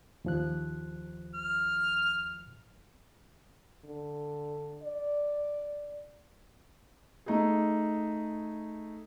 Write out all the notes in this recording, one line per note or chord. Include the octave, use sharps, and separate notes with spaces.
D#2 F3 F#6
F6
D3
D5
A3 D#4 G#4